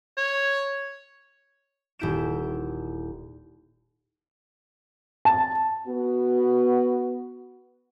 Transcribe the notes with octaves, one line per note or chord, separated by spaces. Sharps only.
C#5
D#1 C4 E4 G6 D7 E7
A5
B3 F#4